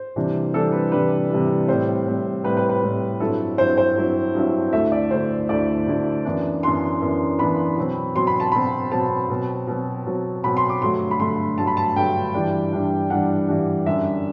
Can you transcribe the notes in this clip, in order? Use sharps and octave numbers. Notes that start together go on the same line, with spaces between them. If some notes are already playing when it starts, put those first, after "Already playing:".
Already playing: C5
C3 E3 G3 D4
C3 E3 G3 D4 A4
B4
C3 E3 G3 D4 B4
C3 E3 G3 D4
A2 G3 C4 C5
A2 G3 C4
A2 G3 C4 B4
B4
B4
A2 G3 C4
G2 F#3 C4 E4 A4
G2 F#3 C4 E4 C5
C5
G2 F#3 C4 E4
G2 F#3 C4 E4
D2 D3 A3 E4 E5
D5
D2 D3 A3 E4 C5
D2 D3 A3 E4 D5
D2 D3 A3 E4
F#2 E3 B3 D4
F#2 E3 B3 D4 C6
F#2 E3 B3 D4
F#2 E3 B3 D4 B5
B2 F#3 C4
B2 F#3 C4 C6
B5
A5
B2 F#3 C4 B5
B2 F#3 C4 A5
B2 F#3 C4
B2 F#3 C4
B2 F#3 C4
B2 F#3 C4 B5
C6
D6
G2 D3 F#3 A3 C6
B5
G2 D3 F#3 A3 C6
G2 D3 F#3 A3 A5
B5
A5
G2 D3 F#3 A3 G5
G2 E3 G3 D4
G2 E3 G3 D4
G2 E3 G3 D4 F#5
G2 E3 G3 D4
F#2 D3 G3 D4 E5